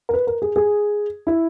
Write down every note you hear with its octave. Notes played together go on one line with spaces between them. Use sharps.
A#4
B4
A#4
G#4
G#4
E4